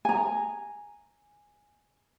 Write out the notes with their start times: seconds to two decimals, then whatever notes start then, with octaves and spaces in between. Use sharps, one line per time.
0.05 G#5 A#5